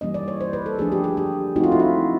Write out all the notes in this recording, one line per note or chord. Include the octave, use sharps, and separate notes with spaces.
E3 G3 A#3 C#4 D#5
D5
C#5
C5
B4
A4
F3 A3 D4 G#4
G4
G#4
G4
F3 A3 C4 D#4 F#4
F4
E4
F4